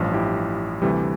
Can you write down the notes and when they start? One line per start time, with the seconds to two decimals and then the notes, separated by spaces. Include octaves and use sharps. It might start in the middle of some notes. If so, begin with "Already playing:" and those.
Already playing: A1 G2 F3
0.13 E4 G4
0.82 D2 C3 E3 G3